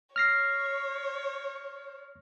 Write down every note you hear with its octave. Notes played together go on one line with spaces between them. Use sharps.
C#5 F6 A#6 C7